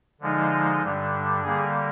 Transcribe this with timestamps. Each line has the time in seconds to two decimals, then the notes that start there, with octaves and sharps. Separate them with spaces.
0.21 D3 F3 G#3 D#4
0.83 G2 D3 G3 D4
1.43 D3 G3 A#3 G#4